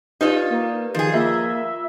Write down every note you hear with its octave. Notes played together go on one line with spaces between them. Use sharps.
D#4 F4 G4 B4 D5
A#3
D#3 F3 G#4
A#3 F4 E5